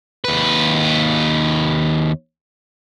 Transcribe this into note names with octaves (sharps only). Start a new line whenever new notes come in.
D#2 B4